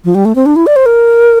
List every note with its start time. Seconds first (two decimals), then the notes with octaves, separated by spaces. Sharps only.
0.05 F3
0.15 G3
0.25 A3
0.35 C4
0.46 D4
0.56 E4
0.67 D5
0.76 C5
0.86 A#4